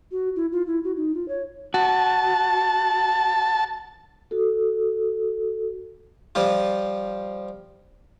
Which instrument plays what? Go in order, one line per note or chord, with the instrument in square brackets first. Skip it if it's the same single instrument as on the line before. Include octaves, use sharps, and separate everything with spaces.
[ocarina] F#4
E4
F4
E4
F#4
D#4
F4
C#5
[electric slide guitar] F#4 [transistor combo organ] A5
[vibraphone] F#4 A4
[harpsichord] F3 G3 F4